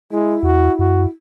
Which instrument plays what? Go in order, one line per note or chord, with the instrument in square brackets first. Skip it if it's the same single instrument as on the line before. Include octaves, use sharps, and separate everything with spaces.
[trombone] G#3 [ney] E4
[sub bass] E2 [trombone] F#4
[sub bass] F#2 [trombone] F#4